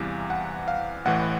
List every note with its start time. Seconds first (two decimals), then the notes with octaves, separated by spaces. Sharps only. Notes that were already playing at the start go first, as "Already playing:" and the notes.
Already playing: E2 C3 E3 G3 F5
0.30 F#5
0.68 F5
1.05 A1 A2 E3 F#5